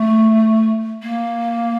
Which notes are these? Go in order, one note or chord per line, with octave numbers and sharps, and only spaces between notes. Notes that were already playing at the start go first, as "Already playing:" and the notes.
Already playing: A3
A#3